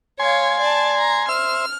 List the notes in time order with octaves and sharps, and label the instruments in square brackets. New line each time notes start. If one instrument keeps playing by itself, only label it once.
[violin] C#5 F5 [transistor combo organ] G#5 C6
[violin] D5 A5
A#5
[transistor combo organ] C5 E5 [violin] F6